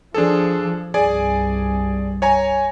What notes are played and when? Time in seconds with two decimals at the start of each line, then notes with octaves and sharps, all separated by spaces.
0.14 F3 D4 G#4 A4
0.94 C2 G2 G#4 D5 G#5
2.22 C#5 G#5 A#5